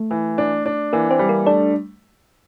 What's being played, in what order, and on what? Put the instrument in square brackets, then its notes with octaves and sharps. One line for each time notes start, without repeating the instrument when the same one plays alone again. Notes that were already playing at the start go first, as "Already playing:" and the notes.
Already playing: [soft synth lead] A3
[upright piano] E3
D4
D4
[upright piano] E3 [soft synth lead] A#3
[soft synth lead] C4
[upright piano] G3
[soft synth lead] A#3
[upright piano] A3 [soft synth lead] D4